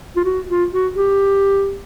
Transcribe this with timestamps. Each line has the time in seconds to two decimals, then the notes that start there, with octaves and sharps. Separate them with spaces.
0.16 F4
0.24 F#4
0.48 F4
0.72 F#4
0.95 G4